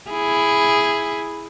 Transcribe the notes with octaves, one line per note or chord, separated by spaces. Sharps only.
E4 G#4